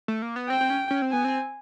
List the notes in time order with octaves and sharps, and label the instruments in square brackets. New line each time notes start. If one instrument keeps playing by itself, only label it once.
[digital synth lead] A3
A#3
B3
[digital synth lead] C4 [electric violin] G5
[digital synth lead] C4
C#4
C#4
C4
[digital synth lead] B3 [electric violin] G#5
[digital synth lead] C4